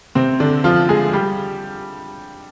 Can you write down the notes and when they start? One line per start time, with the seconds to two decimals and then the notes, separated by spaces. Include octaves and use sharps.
0.15 C3 C4
0.40 D3 D4
0.64 F3 F4
0.89 G#3 G#4
1.13 G3 G4